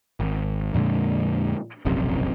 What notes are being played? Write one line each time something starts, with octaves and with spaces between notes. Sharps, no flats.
G#1
F2 A#2 D3 G#3
E1 A#1 F#2 C3